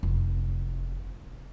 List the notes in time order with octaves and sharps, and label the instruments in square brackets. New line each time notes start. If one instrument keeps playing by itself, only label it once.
[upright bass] F1 E4